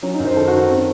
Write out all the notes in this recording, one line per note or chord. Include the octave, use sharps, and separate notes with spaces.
F#3 C#4
D#4
F#2
C5
D#3 A4
F#4
D#3
C4